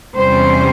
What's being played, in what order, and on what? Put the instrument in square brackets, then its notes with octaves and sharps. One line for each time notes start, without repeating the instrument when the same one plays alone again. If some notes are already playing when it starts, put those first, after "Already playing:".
[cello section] E2 C3 G3 C#4 C5